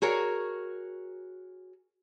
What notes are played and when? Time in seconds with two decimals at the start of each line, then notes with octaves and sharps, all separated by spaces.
0.02 F#4 G#4 A#4 C#5